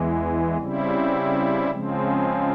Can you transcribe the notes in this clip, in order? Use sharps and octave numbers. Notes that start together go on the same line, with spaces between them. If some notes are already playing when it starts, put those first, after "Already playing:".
Already playing: E2 E3 G#3
C#3 G3 C4 E4
C#3 F3 G#3 C4